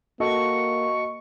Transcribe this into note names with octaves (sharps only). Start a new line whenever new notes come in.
A#3 F#4 A4 D#5 C#6